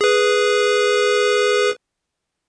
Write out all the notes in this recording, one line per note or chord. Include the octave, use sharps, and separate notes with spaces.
G#4 B4